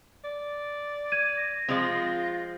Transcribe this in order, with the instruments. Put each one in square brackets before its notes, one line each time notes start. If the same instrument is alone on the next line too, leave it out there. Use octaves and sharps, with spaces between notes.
[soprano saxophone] D5
[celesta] G#6 D#7
[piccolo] A#6
[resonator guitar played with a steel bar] F3 G#3 C4 [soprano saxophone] F4